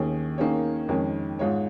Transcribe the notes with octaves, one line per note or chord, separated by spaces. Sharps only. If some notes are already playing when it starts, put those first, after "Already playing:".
Already playing: D#2 D#3 C#4 G#4
D#3 A#3 C#4 G#4 C#5
F2 D#3 G#3 C#4
G#2 G#3 F4 C#5